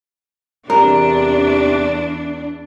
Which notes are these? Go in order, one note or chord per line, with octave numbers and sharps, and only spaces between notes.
E2 C3 D4 A#4